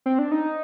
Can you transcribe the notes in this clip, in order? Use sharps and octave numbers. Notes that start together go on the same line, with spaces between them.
C4
D4
D#4